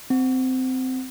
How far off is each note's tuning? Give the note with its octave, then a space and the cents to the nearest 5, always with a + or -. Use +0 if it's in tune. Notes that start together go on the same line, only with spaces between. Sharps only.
C4 -15